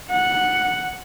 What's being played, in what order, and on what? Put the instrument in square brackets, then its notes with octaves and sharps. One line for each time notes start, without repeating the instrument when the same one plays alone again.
[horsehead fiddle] F#5